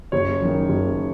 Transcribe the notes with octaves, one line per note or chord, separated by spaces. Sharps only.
F#1 C#5
F#2 D#3
F#1